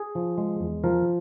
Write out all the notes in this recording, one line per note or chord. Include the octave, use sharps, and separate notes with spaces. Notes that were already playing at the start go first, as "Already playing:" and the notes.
Already playing: G#4
F3
G#3
E2
F3 A#4